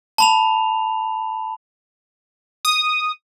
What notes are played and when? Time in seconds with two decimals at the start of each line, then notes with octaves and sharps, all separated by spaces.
0.18 A5 B5 F7
2.65 D#6